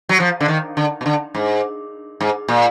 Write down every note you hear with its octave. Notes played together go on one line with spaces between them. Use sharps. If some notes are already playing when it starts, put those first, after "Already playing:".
F#3
F3
D3
D#3
D3
B2
D3
G#2
G#2
A#2